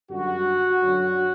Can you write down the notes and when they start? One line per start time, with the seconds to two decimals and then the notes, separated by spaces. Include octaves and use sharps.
0.10 F#2 D3 G3 F#4
0.82 F#2 D3 F#3